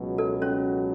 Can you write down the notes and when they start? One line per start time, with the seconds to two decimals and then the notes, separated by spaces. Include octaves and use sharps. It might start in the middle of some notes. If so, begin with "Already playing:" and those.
Already playing: C#2 B2 F#3
0.18 A4
0.42 C#4 C#5